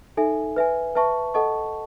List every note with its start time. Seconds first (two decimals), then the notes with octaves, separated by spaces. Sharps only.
0.17 D#4 A4 E5 G#5
0.56 B4 E5 G#5
0.95 B4 E5 A5 C#6
1.34 A4 D#5 F#5 A5 C#6